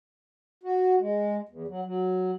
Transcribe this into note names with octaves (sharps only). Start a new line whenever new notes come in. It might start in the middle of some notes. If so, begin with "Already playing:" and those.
F#4
G#3
E2
F#3
F#3